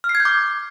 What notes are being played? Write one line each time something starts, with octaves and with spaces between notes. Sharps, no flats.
F6
C7
G#6
G6
D6